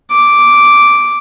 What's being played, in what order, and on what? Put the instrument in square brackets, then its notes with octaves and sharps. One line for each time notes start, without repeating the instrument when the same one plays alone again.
[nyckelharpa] D6